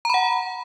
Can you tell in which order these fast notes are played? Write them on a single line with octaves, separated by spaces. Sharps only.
A#5 B5 F#5